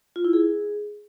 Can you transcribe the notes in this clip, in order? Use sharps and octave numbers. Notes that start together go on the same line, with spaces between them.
F4
E4
G#4